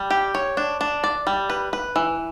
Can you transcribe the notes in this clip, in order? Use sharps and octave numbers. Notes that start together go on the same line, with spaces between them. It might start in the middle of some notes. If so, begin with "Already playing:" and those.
Already playing: G3
G4
C#5
D4
D4
D5
G3
B4
B4
E3